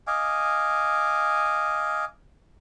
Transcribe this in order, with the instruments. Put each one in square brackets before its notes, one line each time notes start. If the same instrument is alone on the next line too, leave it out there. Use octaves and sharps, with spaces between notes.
[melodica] D#5 F5 G#5 D6